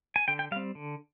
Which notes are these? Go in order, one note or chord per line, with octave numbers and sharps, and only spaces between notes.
G#5
D3 G5
G5
G3 C4 F5
D3